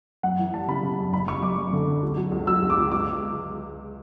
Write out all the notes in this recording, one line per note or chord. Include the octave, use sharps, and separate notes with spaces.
F#2 F#5
E3
G3 A5
C#3 B5
C#3
F#2
F#1 B5
F#1 C#6
F#2 D6
F#2
D3
D3
C#2
F#3
C#2
F#3 E6
C#2
D6
C#2
C#2 D6